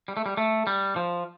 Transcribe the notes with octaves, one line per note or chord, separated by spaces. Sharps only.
G3
A3
G3
A3
G3
F3